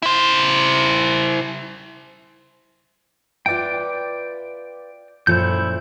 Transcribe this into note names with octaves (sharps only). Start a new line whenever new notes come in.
E4 C5
F4 B4 D5 E5 G5
F#2 A#2 F3 E4 A4 G6